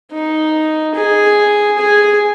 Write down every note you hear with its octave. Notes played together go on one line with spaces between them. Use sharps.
D#4
G#4
G#4